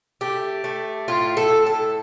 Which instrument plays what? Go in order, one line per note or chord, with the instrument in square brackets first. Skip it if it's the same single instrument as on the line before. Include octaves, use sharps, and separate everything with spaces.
[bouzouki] A3 G4
A3
A2 F4
A4
A2
A4